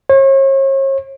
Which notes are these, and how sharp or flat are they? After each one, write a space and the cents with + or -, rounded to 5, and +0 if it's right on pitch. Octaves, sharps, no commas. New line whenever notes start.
C#5 -40